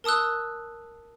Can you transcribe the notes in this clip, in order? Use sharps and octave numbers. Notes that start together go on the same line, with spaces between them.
A#4 A5 D#6 E6 F#6